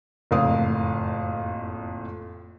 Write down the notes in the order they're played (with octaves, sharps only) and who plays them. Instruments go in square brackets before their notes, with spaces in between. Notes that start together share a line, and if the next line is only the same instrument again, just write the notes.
[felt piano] F#1 F2 A2 F5 D#6